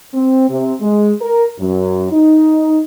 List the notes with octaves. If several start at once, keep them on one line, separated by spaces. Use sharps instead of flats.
C4
C3
G#3
A#4
F#2
D#4